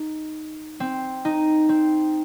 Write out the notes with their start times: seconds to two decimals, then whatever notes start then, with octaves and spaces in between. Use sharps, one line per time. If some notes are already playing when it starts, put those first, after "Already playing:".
Already playing: D#4
0.80 C4
1.25 D#4
1.69 C4